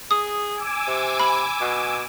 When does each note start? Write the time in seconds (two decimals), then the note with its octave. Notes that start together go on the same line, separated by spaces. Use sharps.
0.11 G#4 D#6
0.55 G#5 D6 E6
0.87 C3
1.19 B5
1.61 B2